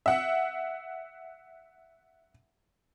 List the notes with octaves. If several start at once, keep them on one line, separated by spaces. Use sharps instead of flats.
E5 F#5